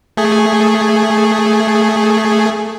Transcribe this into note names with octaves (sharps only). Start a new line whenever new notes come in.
A3 G#4